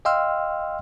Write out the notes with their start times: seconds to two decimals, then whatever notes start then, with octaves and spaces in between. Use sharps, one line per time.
0.05 D#5 F5 G5 C6 E6 F6